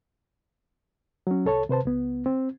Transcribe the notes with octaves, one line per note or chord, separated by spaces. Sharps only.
F#3 C#4
C2 A4 C#5 A5
C3 B4 C5 A5
C#2 B3
C4